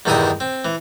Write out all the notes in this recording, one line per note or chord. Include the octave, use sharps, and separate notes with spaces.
E2 G2 D#3 E4 D#5 D#6
C4
E3